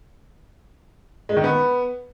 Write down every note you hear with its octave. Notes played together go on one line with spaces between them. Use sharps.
G#3
D#3
B3